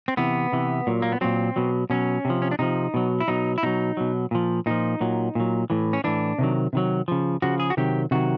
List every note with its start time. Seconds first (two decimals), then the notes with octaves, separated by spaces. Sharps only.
0.08 C4
0.17 C3 E3 B3
0.52 C3 E3
0.87 A#2 F#3
1.02 A#3
1.12 B3
1.21 A#2 F#3 C4
1.56 B2 F#3
1.90 B2 F#3 C#4
2.25 C3 F3
2.42 C#4
2.51 D4
2.59 C3 F3 D#4
2.94 B2 F#3
3.20 E4
3.28 B2 F#3 D#4
3.58 E4
3.63 B2 F#3 D#4
3.97 B2 F#3
4.31 A#2 F3
4.66 A#2 F3 D#4
5.01 A#2 F#3
5.35 A#2 F#3
5.70 A2 E3
5.93 C#4
6.04 A2 E3 D4
6.39 C3 D#3 F#3
6.73 C3 D#3 F#3
7.08 C#3 F3
7.42 C#3 F3 F#4
7.60 G#4
7.70 F#4
7.77 C3 D#3 F#3 G4
8.11 C3 D#3 F#3 F#4